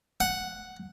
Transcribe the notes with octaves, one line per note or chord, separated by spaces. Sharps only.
F#5